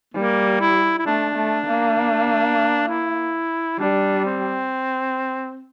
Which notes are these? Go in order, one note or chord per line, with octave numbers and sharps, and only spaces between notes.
G3 A#3
E4
E4
A3 D4
A3
A#3
E4
G3 D4
C4